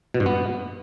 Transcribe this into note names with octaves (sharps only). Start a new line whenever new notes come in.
B2
G2
B3